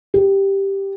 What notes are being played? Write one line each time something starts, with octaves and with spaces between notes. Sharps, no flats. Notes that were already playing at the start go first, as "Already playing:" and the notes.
G4